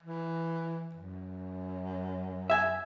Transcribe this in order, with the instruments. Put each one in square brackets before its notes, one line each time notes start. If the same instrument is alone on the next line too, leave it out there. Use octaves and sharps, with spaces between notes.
[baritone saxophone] E3
F#2
[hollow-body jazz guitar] E5 G#5